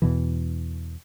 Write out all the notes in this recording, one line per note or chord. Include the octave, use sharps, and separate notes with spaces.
E2 B2 E3